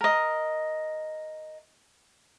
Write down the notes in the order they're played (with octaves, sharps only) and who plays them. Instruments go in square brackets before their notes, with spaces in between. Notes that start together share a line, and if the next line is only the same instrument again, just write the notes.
[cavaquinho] A#4 D#5